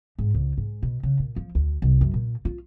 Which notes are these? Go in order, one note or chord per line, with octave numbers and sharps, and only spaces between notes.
G#2
C#2
G#2
B2
C#3
A#2
F3
D2
C2
F#2
A#2
F4